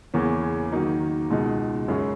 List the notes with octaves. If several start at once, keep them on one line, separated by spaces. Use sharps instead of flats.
E2 C#3 E3 A#3 C#4
D#3 F#3 A#3 D#4
C#2 B2 G#3 D#4
F#2 C#3 G#3 C#4